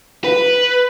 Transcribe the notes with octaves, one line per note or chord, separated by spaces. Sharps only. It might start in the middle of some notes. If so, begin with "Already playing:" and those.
B4